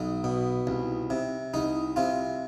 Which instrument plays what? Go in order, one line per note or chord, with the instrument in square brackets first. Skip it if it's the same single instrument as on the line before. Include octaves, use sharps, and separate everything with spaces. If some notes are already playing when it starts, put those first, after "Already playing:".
Already playing: [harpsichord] B1 D#4
B2
C2
C3
C2 D#4
C3 F4